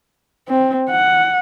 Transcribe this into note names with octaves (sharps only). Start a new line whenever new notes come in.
C4
F#5